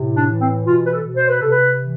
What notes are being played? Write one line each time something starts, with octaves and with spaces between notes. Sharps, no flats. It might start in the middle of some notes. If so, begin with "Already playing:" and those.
Already playing: A2 C3
D4
E3
C4
B2 F4
B4
A4
B2
C5
B4
C3 A4
B4
E3